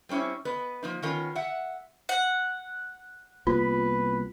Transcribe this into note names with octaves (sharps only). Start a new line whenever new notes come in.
G3 C4 C#4 E4
B3 B4 D#5
F3 A#3 D#4
D#3 B3 C#4 F4 A#4
E5 F#5
F#5
C2 A#3 B3 F4 B4